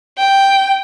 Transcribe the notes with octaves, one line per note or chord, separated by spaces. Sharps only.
G5